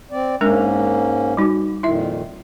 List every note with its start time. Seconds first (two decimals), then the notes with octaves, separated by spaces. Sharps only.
0.11 C4 D5
0.41 G#2 G#3 A#3 C#4 D4 A#4
1.37 G3 D#4 F#4
1.83 F2 A#2 D#3 E4 E5